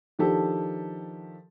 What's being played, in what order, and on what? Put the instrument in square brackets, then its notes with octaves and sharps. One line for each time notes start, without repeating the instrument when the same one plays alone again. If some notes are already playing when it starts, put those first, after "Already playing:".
[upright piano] D#3 F3 D4 G4 A4